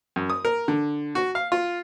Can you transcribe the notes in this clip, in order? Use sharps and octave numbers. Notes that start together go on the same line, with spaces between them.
F#2
D#6
A#4
D3
F#4
F5
F4